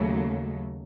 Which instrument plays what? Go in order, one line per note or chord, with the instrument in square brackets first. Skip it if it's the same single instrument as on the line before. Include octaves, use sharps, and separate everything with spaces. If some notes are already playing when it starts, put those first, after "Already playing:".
Already playing: [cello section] D#2 C#3 F#3 A3